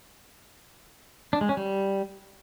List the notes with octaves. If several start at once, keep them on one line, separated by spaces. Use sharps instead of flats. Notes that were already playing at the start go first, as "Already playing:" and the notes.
D4
G#3
C#4
G3